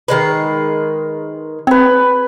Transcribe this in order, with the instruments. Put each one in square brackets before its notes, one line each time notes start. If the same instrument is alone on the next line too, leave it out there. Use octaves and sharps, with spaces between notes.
[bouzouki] D#3 G#3 B4
[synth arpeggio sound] C4 [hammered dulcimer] B4 G#5